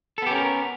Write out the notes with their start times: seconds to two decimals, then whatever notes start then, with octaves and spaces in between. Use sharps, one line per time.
0.18 A4
0.22 B3
0.26 G4
0.31 C#4
0.35 A#4